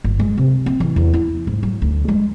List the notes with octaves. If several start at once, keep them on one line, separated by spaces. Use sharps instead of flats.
G1
G#3
C3
C4
E3
E2
E4
G#2
F#3
D2
G#3